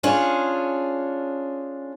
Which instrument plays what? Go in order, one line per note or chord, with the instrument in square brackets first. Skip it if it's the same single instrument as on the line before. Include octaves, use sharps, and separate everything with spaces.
[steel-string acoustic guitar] C#4 D4 F4 G#4